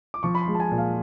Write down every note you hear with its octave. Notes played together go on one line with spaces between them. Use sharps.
D6
F3 C#6
B5
C6
G#3
A5
G#5
A#2
F5